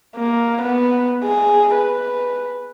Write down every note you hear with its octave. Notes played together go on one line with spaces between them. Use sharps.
A#3
B3
G#4
B4